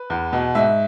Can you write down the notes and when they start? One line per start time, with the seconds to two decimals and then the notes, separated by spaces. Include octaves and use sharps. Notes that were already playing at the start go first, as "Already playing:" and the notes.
Already playing: B4
0.10 E2
0.33 B2
0.55 G#2 E5